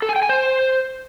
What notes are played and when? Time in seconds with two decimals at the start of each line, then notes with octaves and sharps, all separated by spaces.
0.02 A4
0.09 G#5
0.16 G5
0.23 G#5
0.29 C5